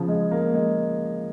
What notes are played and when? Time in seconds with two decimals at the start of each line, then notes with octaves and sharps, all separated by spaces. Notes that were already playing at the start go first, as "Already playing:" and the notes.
Already playing: C#3 F3
0.08 G#3
0.31 A#3
0.54 G#3